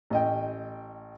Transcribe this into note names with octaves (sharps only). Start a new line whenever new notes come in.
A1 D#5 G5